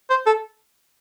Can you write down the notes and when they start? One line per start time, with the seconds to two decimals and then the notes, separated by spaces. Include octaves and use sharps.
0.10 C5
0.26 A4